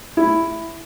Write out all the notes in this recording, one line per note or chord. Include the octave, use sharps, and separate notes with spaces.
E4